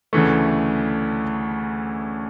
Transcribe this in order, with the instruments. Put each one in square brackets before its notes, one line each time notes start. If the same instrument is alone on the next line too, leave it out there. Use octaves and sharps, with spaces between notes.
[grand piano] D2 C#3 E3 A3